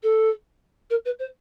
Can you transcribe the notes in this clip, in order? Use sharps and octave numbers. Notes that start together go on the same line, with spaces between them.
A4
A#4
B4
C5